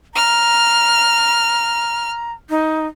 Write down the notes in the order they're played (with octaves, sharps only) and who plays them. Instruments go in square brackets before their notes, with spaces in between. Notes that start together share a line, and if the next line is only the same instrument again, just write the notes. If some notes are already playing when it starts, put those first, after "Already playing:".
[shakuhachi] A#5 [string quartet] F6
[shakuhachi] D#4